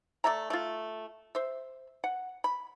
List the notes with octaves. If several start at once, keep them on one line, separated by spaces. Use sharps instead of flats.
A3 D5 E5 A#5
A3 F4
C5 E5
F#5
B5